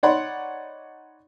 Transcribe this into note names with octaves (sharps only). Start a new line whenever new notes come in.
D#4 C#5 D5 F#5 B5 C6